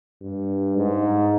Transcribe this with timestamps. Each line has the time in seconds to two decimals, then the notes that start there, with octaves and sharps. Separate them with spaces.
0.21 G2
0.77 G#2